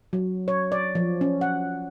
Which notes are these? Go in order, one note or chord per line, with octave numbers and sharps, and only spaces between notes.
F#3
C#5
D5
F3
C#4
F#5